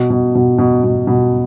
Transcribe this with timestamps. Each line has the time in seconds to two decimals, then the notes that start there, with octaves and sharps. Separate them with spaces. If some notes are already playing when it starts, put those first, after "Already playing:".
Already playing: B2
0.10 B2
0.35 B2
0.58 B2
0.84 B2
1.07 B2